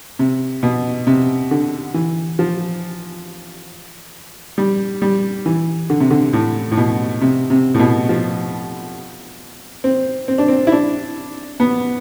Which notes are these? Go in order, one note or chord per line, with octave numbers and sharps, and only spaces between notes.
C3
B2
C3
D3
E3
F3
G3
G3
E3
D3
C3
D3
A2
A2
B2
C3
C3
A2
B2
F3
C4
C4
D4
C4
E4
D4
B3